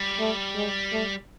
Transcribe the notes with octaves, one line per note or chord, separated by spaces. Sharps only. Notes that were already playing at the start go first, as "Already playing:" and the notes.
Already playing: G3
A3
G#3
A3